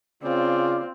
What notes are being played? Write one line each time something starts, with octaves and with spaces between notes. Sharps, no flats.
C#3 C4 F4 D5